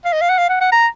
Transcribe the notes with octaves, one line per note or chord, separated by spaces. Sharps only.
F5
D#5
F5
F#5
F5
F#5
F#5
A#5